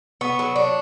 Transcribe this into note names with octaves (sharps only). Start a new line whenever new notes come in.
B3 C#6 C#7
F#3
D4